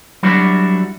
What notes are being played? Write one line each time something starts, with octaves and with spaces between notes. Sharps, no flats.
F#3 G3 D4 E4 F#4